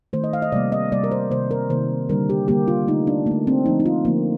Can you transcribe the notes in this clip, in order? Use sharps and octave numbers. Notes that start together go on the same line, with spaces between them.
D#3 A3 C5
D#5
F5
D#5
C3 G3 A#3 D5
D#5
C3 G3 A#3 D5
A#4
C5
C3 D#3 A#3 C5
A#4
C3 D#3 A#3 C5
D3 G3 A#3 A#4
G4
D3 G3 A#3 G4
F4
D3 A3 D#4
D4
D3 A3 A#3
C4
D3 F3 A3 D#4
D#4
F4
D3 F3 A3 A#3